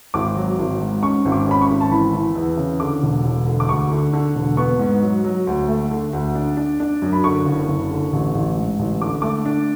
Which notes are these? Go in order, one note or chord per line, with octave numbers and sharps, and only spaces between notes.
G#1 D6
F#3
G#1
G#2
C#4 C#6
G#1
D6
C#4 B5
C#6
G#1
A5
E3 B5
E3
E2
C#3
D3 D6
E1
E1
D3
D6
D2 C#6
D3
D3
E1
B3 C#6
G#2
F#3
F#3
D2
A3
D3
D2
D4
D4
D4
F#2
B5
D3 C#6
F#1
F#1
D3
A1
A1
G#2
A1
D3 D6
A3 D6
D4